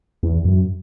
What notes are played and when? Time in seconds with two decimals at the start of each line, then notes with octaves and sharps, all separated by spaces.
0.23 E2
0.45 F#2